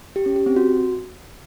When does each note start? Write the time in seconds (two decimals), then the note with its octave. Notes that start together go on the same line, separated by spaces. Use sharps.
0.16 G4
0.26 C#4
0.36 G4
0.46 C4
0.56 F#4